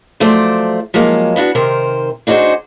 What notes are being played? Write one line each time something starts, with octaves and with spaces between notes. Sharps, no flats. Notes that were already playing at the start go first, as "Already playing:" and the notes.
F3 F#3 A3 C5 D5
F3 F#3 G#3 A#3
B3 D4 F4 F#4
C3 D#3 A#4 C5
D4 D#4 F#4 G#4 C5